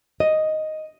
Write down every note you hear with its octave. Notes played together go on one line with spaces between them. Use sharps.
D#5